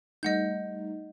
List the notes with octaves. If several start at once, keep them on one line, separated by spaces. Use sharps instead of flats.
G3 A3 D#4 D#5 F#5 G6